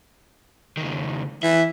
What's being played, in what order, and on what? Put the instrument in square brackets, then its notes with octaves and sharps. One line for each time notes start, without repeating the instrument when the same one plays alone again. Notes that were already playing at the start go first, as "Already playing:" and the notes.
[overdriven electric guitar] C#2 D#3
[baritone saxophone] E3 [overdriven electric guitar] E5